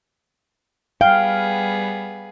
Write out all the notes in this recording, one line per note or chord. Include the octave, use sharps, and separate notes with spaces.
G3 B3 G#4 F5 G5